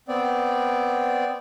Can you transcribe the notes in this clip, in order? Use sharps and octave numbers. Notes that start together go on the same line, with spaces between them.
B3 C4 D5